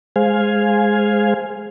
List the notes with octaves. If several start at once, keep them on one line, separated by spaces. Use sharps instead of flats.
G#3 G#4 C5 F5 G#5